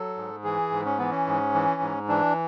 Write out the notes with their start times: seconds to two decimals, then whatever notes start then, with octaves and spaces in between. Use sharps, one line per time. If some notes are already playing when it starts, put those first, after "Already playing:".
Already playing: F#3 A4
0.16 G#2
0.44 E3 G#4
0.71 G#2
0.85 C#4
0.98 E3 B3
1.11 C#4
1.27 G#2
1.54 E3
1.82 G#2
2.09 E3 D4